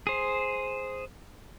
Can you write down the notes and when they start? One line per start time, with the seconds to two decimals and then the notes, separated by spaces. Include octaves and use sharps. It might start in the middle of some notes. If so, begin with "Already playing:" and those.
0.07 G#4 C5